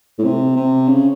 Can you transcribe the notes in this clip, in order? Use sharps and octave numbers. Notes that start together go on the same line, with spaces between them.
A2
C3
C3
C#3